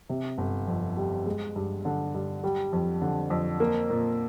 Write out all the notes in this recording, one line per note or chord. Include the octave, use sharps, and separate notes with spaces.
C3
G1
F2
G3
G#3
G2
D3
G2
G3
F2
D3
F2
A#3
A#2